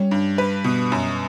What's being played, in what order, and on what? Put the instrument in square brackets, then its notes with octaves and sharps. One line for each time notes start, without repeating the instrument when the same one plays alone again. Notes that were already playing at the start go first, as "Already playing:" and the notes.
Already playing: [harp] G3 [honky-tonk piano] C#4
[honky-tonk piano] G2
B4
B2
F#2